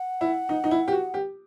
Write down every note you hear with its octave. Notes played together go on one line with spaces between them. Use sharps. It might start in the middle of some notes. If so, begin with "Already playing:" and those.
Already playing: F#5
E4
D#4
D#4
E4
G4
F#4
G4